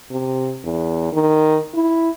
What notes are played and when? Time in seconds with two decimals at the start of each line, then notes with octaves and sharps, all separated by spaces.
0.11 C3
0.64 E2
1.13 D#3
1.74 E4